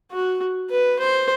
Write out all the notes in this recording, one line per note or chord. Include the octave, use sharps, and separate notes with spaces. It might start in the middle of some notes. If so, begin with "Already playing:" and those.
F#4
B4
C5